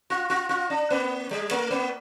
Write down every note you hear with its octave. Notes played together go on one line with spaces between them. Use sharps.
F4
F4
F4
D4
A#3
G3
A3
A#3